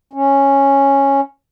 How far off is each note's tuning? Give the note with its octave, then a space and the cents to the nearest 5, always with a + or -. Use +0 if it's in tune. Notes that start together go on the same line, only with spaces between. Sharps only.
C#4 -5